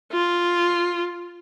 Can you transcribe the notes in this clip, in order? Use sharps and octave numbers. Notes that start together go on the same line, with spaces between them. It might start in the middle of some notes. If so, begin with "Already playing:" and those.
F4